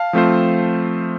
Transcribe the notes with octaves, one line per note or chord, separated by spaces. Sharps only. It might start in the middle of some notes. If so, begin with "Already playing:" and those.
Already playing: F5 A5
F3 A3 C4 F4 C5